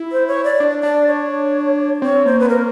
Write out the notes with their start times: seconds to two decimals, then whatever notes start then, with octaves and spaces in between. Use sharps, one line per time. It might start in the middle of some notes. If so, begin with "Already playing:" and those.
Already playing: E4
0.12 C5
0.28 C#5
0.44 D5
0.60 D4
0.83 D4 D5
1.07 C#5
2.02 C4 C#5
2.26 A#3 C5
2.40 B4
2.49 A#4